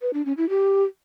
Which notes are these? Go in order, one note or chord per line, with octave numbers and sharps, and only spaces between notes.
B4
D4
C#4
E4
G4